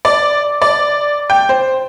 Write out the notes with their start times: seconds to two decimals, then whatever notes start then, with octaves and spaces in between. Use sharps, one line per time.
0.05 D5
0.62 D5
1.30 G5
1.49 C5